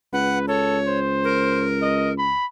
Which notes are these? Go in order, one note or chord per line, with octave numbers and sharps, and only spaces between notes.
C#2 B4 F#5
A4 C#5
C5
A#4
D#5
B5